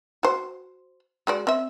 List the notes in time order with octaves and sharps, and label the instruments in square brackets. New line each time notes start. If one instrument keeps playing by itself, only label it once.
[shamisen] F#4 C5
G#3 F#4 D5
C4 E5